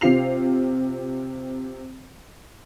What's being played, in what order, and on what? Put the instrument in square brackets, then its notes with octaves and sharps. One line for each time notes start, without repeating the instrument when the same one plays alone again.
[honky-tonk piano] C3 C4 F4 C7 F7